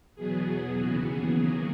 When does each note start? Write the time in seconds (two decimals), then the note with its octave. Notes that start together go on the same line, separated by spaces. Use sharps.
0.16 E2 B2 F#3 B3 G#4
0.75 D#2 C#3 E3 B3 F#4
1.05 G#4
1.35 D#2 D#3 F#3 A#3 G#4